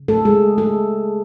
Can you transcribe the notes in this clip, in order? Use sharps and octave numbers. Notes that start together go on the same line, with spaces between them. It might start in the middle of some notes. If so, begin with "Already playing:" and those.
Already playing: C#3
A3 A4
G#3 G#4
A3 A4